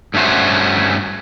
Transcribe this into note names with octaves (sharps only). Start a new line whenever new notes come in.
G2 A3 C#4 F#4 C5